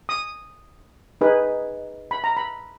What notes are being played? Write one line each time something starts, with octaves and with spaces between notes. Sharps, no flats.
D#6
D#4 G#4 B4
B5
A#5
B5